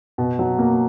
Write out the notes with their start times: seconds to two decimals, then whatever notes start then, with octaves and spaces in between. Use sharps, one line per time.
0.18 B2
0.39 F#3
0.59 A#3